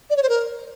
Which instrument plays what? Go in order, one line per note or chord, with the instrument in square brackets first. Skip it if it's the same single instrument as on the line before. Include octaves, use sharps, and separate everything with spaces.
[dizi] D5
C#5
C5
A#4